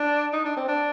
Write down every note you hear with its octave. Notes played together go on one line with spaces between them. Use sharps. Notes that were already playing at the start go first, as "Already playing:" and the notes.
Already playing: D4
D#4
D4
C4
D4